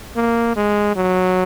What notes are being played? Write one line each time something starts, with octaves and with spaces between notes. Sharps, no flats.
A#3
G#3
F#3